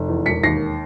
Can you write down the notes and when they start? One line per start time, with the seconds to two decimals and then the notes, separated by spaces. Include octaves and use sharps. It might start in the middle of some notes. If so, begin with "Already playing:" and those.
Already playing: F1
0.09 E2
0.26 E1 B6 C#7
0.43 D#2 A#6 C7